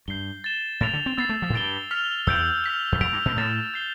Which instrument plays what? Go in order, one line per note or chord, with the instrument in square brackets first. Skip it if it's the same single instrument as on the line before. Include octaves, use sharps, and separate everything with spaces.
[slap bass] G2 [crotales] G6 C7 G7
[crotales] A6 E7 G7
[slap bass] A2 [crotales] A6 D7 F7
[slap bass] D3
C4
[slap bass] B3 [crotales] E6 A6 C7
[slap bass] A3
F3
A2
[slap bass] G2 [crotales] A6 D7 G7
[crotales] F6 B6 F7
[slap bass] E2 [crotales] E6 G6 D7 F7
[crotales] F6 B6 F7
[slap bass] E2
[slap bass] F2 [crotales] G6 B6 D7 F7
[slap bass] G2
B2
[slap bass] A2 [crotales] E6 A6 E7
[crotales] G6 C7 G7